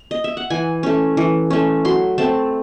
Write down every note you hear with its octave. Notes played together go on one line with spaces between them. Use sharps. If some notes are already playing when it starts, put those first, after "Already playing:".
Already playing: C#5
D#5
E5
F#5
E3 G#5
A3 C#4
E3
A3 C#4
F#3 C6
A3 C4 A5